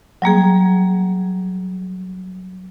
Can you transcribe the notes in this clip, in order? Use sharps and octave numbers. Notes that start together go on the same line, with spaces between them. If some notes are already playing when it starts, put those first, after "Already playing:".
F#3 G3 A#3 G#4